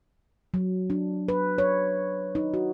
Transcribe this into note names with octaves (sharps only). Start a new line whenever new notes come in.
F#3
D4
B4
C#5
D#4
F#4